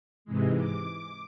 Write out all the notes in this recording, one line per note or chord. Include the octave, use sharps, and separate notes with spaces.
G#2 C3 E3 G#3
D6